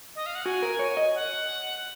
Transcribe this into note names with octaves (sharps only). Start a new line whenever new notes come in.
D#5
F5
F#5
F#4 G#5
A#4
C#5
D#5
F#5